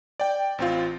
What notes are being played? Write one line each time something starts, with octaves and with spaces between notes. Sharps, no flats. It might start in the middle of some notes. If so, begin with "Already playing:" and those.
D5 G5
A1 C4 F4